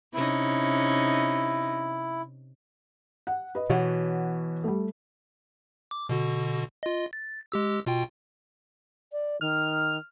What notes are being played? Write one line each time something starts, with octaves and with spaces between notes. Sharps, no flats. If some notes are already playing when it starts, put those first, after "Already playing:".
C3 C#4 D#4 E4
F#5
B4 D#5
B2 E3 F#4 C#5 F#5
G3 A3
D6
B2 D3 F#4
F4 D#5
A6
G#3 G4 E6
B2 F4 G5
D5
D#3 F6